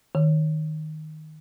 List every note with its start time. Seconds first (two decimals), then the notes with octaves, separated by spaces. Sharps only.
0.15 D#3